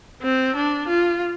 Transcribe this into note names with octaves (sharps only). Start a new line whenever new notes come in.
C4
D4
F4